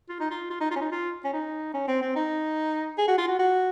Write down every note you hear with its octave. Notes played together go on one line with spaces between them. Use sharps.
F4
D#4
F4
F4
D#4
F4
C#4
D#4
F4
C#4
D#4
C#4
C4
C4
D#4
G#4
F#4
F4
F#4
F#4